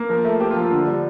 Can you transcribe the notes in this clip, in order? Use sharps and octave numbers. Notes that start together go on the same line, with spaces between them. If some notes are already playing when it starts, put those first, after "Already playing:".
Already playing: A#3
F3 A#4
A3
A#3 G4
F4
F3 A4
D3
G3